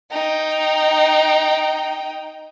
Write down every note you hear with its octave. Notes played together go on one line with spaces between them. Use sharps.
D#4 G5